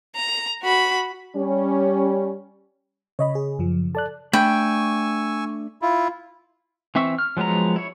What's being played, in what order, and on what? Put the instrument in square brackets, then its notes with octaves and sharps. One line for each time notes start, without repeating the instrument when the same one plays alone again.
[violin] A#5
F#4 B5
[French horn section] G3 C#4
[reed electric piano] C#3 [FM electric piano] C#5 D#5 B5
[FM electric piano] G#4
F#2 F3
[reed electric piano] A4 D5 F#6 [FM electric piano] A5
[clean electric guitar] A3 D4 B5 [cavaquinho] G5 [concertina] G#5 C#6 E6
[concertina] E4 F4
[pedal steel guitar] E3 C4 E5 C#6 E6
F6
F3 F#3 G#3 B3 A#5
E4 C#5